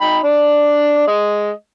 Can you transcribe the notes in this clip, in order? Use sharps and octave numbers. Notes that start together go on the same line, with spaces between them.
D#4 G5 B5
D4 D5
G#3 D#5